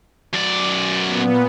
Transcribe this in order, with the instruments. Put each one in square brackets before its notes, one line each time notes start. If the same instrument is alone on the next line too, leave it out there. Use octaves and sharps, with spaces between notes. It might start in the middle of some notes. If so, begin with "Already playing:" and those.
[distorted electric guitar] F#2 D5
[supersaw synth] A#2 B3